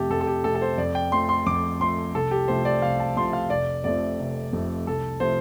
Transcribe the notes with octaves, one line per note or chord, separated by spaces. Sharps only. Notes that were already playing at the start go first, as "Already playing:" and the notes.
Already playing: F2 C3 A3 G4 A4
F2 A4
A4
G4
C3 A3 A4
A4
C5
F2 D5
G5
F3 A3 C6
C6
F2 D6
F3 A3 C6
C2 A4
G4
C3 F3 A3 C5
D5
C2 F5
A5
C3 F3 A3 C6
F5
F1 D5
F2 C3 F3 A3 D5
F1
F2 C3 F3 A3
C2 A4
C3 F3 A3 C5